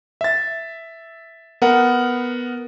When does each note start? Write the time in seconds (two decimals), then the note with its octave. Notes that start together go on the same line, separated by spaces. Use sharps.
0.21 E5 A6
1.62 B3 A#4 F#5